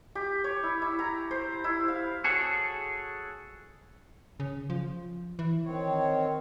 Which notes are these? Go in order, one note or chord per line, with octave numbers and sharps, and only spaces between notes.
G4
C#5
E4
E4
A#5
C5
E4
F5
F#4 G#4 A4 C#5
C#3
F3
E3
D#3 C4 C#5